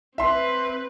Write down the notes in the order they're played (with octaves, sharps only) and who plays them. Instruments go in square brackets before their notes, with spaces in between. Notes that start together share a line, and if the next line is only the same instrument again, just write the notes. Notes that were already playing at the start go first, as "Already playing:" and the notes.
[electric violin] C4 B4 [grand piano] E5 C6